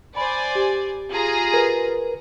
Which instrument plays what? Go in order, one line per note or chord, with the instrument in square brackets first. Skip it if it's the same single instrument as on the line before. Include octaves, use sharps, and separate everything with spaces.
[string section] C5 D5 G#5 [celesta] B5
[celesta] G4
[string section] F4 G#4 A#5
[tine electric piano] A#4 B4